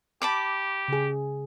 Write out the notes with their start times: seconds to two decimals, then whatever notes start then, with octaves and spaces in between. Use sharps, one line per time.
0.22 G4 A5 B5 D6
0.88 C#3 G#4